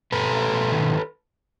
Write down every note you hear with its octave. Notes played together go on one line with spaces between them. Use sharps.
B2 A4 B4
A3
B2
D#3